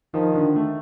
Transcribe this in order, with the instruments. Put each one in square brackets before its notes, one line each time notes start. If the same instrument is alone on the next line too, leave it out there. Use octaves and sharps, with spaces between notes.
[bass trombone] D#3 [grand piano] F3
[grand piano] D3
A3